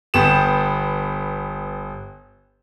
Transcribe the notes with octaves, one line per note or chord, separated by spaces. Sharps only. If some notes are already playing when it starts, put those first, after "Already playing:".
G1 B3 G4 E7